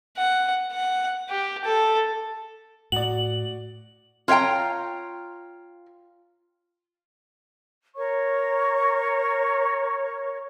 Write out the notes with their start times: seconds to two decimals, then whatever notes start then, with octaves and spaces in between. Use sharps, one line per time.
0.17 F#5
0.72 F#5
1.29 G4
1.65 A4
2.92 A2 F#4 D5 F#7
4.28 F4 C#5 E5 G5 A#5
7.96 A#4 C#5 C#6